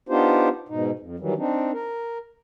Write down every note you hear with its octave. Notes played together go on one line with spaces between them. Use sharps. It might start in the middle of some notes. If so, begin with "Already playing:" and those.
B3 D4 D#4 F4 G4 C5
G#2 B2 D#4
F2
D#3 E3 F#3 G3
C4 D4 D#4
A#4